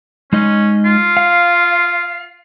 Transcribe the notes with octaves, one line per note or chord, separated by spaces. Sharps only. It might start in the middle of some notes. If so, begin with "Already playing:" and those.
G#3 C#4 D#4 D#5
F4
F5